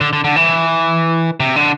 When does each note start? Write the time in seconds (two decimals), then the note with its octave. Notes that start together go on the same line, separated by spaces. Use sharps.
0.01 D3
0.13 D3
0.24 D3
0.36 E3
1.40 C3
1.56 D3